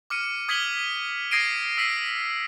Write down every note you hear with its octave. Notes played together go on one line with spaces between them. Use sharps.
D6 F6 C#7 D#7
D#6 G#6 B6 D#7 F#7 G7
D#7
D#6 G#6 A#6 C7 D7 D#7
E6 B6 C7 D#7